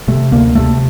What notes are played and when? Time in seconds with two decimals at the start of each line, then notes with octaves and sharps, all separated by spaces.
0.08 C3 A3
0.32 D2 A#3
0.55 C3 A3